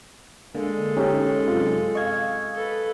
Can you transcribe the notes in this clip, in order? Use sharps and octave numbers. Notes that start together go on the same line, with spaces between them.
D3 G#3 A#3 A4
C#4 D#4 G4
F#2 C3 F4
D#5 F5 C#6 G#6
A4 B4